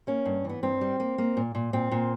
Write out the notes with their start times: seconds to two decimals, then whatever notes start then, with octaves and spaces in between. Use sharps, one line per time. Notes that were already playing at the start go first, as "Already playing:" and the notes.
0.07 A#3 C#4
0.25 G2
0.45 E3 B3
0.63 G2 C4
0.81 G3
1.00 A#3
1.18 A#3
1.37 A#2
1.55 A#2
1.73 A#2 C4
1.91 A#2